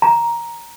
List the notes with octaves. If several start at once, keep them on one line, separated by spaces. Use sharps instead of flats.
A#5